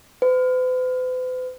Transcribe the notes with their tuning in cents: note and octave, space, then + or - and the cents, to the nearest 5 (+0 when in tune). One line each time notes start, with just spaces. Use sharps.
B4 +45